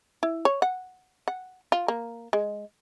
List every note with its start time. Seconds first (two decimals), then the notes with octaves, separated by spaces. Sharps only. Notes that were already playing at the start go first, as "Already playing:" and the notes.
0.23 E4
0.45 C#5
0.62 F#5
1.28 F#5
1.72 F4
1.88 A#3
2.33 G#3